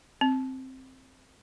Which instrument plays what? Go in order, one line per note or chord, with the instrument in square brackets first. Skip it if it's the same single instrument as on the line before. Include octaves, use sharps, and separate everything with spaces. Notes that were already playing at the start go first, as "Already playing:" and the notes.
[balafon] C4